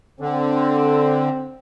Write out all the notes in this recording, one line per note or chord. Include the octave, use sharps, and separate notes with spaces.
D3 C4